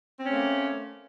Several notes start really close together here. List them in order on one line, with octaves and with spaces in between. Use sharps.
C4 C#4 A3 A#3